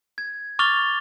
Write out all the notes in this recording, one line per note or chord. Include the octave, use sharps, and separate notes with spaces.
G#6
C#6 D6 F6 A6 F7 G7